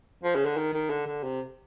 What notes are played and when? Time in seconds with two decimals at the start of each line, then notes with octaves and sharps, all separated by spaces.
0.24 F3
0.35 C#3
0.46 D3
0.57 D#3
0.73 D#3
0.90 D3
1.07 D3
1.24 C3